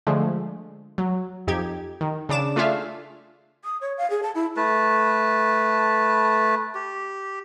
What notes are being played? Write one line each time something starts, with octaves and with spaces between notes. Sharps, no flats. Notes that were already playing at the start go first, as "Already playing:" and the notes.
D3 F3 G#3 A3
F#3
F2 D#4 G4 G#6
D#3
C#3 D4 D6 E7
A3 D4 F4 G#4 E5 F5
D#6
C#5
F5
G#4
A5
E4
A3 B4 A5
G4